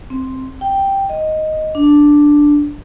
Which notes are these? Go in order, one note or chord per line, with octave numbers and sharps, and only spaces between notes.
C4
G5
D#5
D4